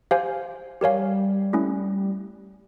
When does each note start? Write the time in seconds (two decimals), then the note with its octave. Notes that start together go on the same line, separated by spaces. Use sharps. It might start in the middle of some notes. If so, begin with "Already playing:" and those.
0.11 G4 C5 F5 G#5
0.81 G3 G4 A#4 C#5 F5 G#5
1.53 A3 C#4 E4